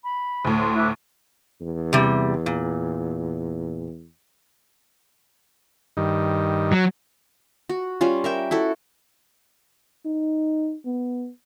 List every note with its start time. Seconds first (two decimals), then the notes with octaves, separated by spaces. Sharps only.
0.03 B5
0.45 D2 A2
0.59 C6
0.76 E4 D6 F#6
1.61 E2
1.93 C3 G3
2.46 A#2
5.97 G2 D#3
6.72 F#3
7.69 F#4
8.01 G3 C#4 F4
8.24 A#4 E5 G5
8.51 E4 F#4 A4
10.06 D#4
10.86 B3